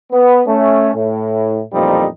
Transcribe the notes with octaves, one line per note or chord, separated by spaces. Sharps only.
B3
A3 C#4
A2
A1 F2 A#2 F3 G3 D#4